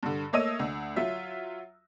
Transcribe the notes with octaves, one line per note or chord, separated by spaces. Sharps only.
G2 D3
A3 A#3 C#5 D#5 E6 D#7
D2
F#3 F4 E5